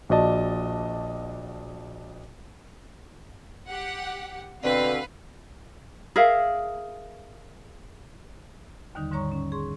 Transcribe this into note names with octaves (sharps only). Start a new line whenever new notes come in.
A#1 F#4 D5 D#5 A5
G4 F#5
B2 D3 C4 B4 F5
G#4 A#4 E5 F5
D#2 D3 D#3 G3 D#4
G#2 D3 G3 C#5 A#5 C#6
C#4
G#4 C6 C#6